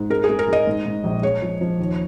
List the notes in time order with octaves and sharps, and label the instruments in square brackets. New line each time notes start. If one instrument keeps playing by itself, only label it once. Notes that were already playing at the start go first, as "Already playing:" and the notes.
Already playing: [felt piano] G#2
G#3 A#4
G#4
G#3
A#4
G#3 D#5
G#2
G#2
A#1
G#3 C#5
F3
F3
D#2